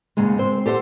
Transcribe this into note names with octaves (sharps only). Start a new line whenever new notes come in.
D#2 G#2 C#3 G#3
C4 C5
G4 A4 C5 F#5